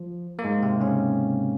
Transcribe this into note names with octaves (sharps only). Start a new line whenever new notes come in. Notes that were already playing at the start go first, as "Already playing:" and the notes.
Already playing: F3
A#3
G#2 G#3
C3 C4
C#3 C#4